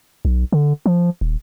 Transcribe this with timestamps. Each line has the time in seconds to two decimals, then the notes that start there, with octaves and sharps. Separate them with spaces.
0.25 B1
0.52 D3
0.86 F3
1.21 D#1